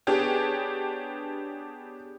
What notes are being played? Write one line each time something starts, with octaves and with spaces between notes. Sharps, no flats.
B3 D4 G4 G#4 C#5